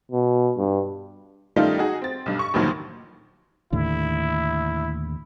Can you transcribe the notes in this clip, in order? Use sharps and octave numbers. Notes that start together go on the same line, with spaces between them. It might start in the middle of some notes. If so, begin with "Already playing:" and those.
B2
G2
D#3 G3 A3 C#4 D#4 F4
D#4 F#4 G#4
C4 A6
B1 G2
C#6
A1 D2 A#2 D#3 F3 F#3
D#2 A2 D3 E4